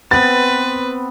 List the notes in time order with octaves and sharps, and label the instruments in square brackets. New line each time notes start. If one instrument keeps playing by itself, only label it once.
[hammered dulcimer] B3 C4 [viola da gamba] B4 [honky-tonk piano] A6